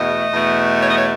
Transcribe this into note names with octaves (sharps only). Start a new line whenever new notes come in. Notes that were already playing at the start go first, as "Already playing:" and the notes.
Already playing: E2 B2 A3 D#5
E2 B2 A3
C#5
D#5
C#5